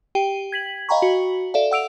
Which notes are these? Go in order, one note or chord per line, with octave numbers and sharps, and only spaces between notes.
G4 G5 D#7
G#6 B6 F#7
D#5 F5 G5 A#5 B5 C#6
F#4
A4 D5 E5 F5
F#5 E6 D7 F7